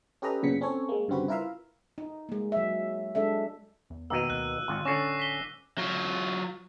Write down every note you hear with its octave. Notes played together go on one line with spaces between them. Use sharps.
C#4 G4 A4 B4 D#5 A#5
F#2 A#2 C#3 B3 B6 C#7
C4 C#4 A4 C#5
G#3 A#3
G1 G2 C#3 C4 F#4 B4
E4 F4 A#4 B4 E5 F5
D#4
G#3 A#3
F#3 E5
G#3 D4 A4 E5
E2
B2 D#3 A#3 E6 D#7
D2 F#6
D1 G#1 F4
D3 C#4 D6 A#6 C7
B6 G7
F#3 F4